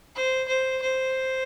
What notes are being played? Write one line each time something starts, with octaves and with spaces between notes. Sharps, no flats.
C5
C5
C5